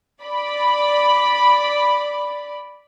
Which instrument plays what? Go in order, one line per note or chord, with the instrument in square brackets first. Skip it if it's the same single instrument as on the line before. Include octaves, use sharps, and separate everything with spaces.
[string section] D5 B5